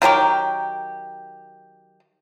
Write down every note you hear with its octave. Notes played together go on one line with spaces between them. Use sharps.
D#3 F#3 G4 A#4